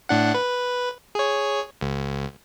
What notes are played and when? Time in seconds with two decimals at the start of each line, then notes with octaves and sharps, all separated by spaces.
0.09 A2 D4 F#5
0.34 B4
1.15 G#4 C#5
1.81 C#2